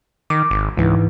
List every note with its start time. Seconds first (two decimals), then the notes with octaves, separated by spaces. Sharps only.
0.30 D#3 D6
0.51 G#1
0.77 C#2 G#2 E3